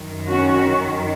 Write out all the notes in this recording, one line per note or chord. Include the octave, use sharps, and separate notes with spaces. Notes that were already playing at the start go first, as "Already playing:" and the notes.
Already playing: F#2 D#3
C#4 F#4